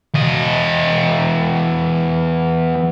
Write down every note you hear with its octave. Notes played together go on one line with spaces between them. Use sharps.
E2 D#5